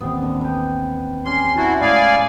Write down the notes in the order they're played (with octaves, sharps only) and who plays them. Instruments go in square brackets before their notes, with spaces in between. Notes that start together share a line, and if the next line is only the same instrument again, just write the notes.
[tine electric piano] A1 D#2 C4 [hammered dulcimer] B3
[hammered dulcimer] D3
B4 G5
[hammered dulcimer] G3 C#4 [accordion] C6
[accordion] E4 F#4 [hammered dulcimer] A5
[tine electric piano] A2 B5 [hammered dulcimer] G#3 [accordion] D5 F5 G#5